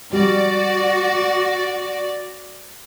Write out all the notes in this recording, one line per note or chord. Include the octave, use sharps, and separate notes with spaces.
G3 F#4 D5